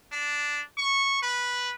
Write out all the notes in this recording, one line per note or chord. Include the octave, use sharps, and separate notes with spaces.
D4
C#6
B4